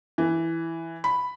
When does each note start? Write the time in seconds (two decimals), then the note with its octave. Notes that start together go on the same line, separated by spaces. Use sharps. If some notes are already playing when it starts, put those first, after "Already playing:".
0.18 E3
1.04 B5